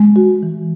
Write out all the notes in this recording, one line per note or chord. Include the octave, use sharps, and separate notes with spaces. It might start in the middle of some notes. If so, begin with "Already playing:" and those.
Already playing: G#3
F#4
E3